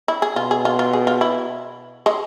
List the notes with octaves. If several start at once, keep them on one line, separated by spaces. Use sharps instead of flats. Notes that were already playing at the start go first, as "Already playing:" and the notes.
E4
G#4
B2 F4
G#4
F4
F4
G#4
F4
E4
G#3